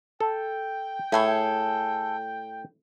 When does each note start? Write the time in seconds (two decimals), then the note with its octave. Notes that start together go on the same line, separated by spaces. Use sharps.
0.20 A4 G5
1.12 A2 G#4 A4 G#5